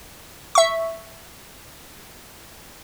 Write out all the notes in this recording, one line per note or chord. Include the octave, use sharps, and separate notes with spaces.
E5 C#6